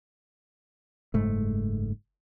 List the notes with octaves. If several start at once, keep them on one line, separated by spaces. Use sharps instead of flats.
F#1 G#2 G#3 A3